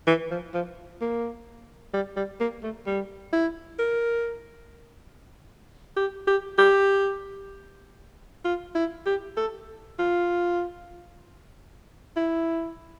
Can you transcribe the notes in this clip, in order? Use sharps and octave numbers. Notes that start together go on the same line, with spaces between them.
E3
F3
F3
A#3
G3
G3
A#3
A3
G3
E4
A#4
G4
G4
G4
F4
E4
G4
A4
F4
E4